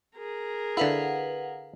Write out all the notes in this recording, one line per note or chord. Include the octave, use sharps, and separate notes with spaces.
G#4 A#4
D3 E4 B4 F5 F#5